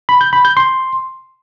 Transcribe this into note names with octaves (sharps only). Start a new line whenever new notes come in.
B5
G6
B5
G6
C6